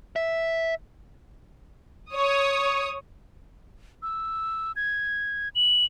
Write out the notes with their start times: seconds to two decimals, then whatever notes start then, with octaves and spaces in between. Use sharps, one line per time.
0.16 E5
2.14 C#5 D#6
4.03 E6
4.76 G#6
5.55 F#7